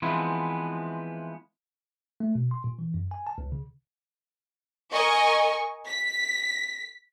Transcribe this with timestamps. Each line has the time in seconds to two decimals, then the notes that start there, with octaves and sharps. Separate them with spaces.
0.02 E3 F3 G#3 B3 C4 E4
2.20 A3
2.35 B2
2.51 C6
2.64 A#2
2.79 E3
2.94 F#2
3.11 G#5
3.27 A5
3.38 C#2
3.52 C#3
4.93 A#4 D#5 G#5 C#6
5.87 B6